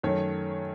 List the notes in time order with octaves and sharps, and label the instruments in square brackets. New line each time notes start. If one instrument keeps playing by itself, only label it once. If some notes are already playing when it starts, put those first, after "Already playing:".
[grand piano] F#2 D#3 A3 C#5